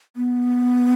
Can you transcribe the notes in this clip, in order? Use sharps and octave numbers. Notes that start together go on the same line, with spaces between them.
B3